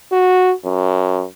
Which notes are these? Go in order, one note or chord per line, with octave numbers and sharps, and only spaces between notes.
F#4
F#2